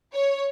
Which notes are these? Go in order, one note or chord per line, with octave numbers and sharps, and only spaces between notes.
C#5